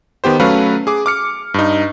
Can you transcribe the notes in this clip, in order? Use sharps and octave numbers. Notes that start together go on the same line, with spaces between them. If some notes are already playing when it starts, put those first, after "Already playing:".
D#3 B3 G4 C5
F#3 A3 C#4 B4 F5
G#4 D6
D6 F6 C#7
G2 D#4